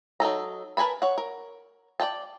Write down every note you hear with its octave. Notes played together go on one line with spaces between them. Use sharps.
F#3 D#4 A4 A#5
A#4 B4 G#5 A5 B5
C#5 F#5
A#4
D5 F5 G5 A5